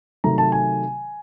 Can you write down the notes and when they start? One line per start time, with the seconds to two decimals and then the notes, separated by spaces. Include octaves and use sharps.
0.24 C3 D#3 F#3 A3 A#5
0.38 A5
0.52 G#5